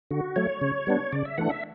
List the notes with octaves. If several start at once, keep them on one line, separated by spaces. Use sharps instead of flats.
D3 F#4
F#3 A3 C#5
C#3
G3 B3 D4
C#3 D5
E5
E3 A3 D4 F#5
E5